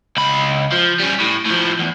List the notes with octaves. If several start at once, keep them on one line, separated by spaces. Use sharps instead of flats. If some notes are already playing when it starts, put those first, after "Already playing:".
C#2 B5
F3
G3 C#4
A2
A2 F3
E2